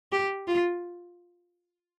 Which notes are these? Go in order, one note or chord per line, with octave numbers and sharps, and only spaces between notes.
G4
F4